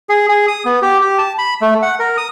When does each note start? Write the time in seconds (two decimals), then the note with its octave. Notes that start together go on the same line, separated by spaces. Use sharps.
0.09 G#4
0.29 G#4
0.48 D#6
0.65 B3
0.82 G4
1.01 G4
1.18 A5
1.38 B5
1.61 A3
1.82 F#5
1.99 A#4
2.17 D#6